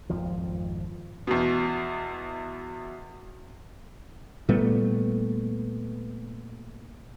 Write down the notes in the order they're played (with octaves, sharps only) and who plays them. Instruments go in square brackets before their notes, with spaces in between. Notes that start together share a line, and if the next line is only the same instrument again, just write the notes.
[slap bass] G#1 F2 F3
[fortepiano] E2 B2
[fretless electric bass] A#2 G3 A3 B3